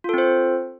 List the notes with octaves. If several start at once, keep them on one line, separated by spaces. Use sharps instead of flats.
C4 F4 A4 C5